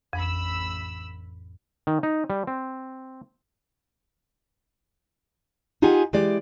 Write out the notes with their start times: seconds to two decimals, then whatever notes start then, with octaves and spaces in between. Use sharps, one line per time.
0.13 A1 F2 B5 E6
1.87 D#3
2.03 D#4
2.30 G3
2.47 C4
5.82 D#4 F4 G4 G#4 F#5 G#5
6.13 E3 G#3 G4 D5